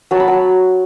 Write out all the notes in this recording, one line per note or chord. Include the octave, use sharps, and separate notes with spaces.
F#3 A5
B5
F#3 A5